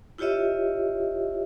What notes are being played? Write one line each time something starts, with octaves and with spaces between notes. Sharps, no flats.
E4 F4 G4 C#5 D#5 E5